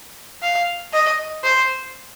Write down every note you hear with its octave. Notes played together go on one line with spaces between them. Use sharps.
F5
D#5
C5